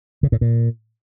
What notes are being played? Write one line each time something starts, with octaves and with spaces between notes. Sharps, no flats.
C#3
A2
A#2